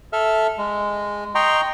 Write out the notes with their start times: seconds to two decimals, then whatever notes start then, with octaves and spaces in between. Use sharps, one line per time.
0.13 A4 E5 F6
0.58 G#3
1.35 D#5 G5 A#5 C6 C#6